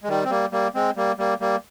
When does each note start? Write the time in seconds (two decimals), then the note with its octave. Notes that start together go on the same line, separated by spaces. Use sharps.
0.03 G#3
0.08 D#3 G3
0.24 C4
0.30 G3 A#3
0.52 G3 A#3
0.75 G#3 C4
0.96 G3 A#3
1.18 G3 A#3
1.40 G3 A#3